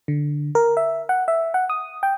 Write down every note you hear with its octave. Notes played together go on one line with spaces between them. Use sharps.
D3
A#4
E5
F#5
E5
F#5
D#6
G5